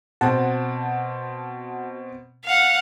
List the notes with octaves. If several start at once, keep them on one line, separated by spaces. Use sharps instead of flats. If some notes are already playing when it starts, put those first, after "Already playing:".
B2 C4 F#4 F#5 A5
F5 F#5